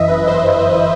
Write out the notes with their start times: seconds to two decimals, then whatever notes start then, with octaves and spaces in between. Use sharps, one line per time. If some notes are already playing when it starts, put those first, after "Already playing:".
Already playing: F#2 E3 D#5 E5
0.08 G1 B4
0.28 G1 C5